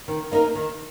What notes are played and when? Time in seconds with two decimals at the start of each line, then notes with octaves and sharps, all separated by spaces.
0.08 D#3
0.31 A#3 D#4 A#4
0.55 D#3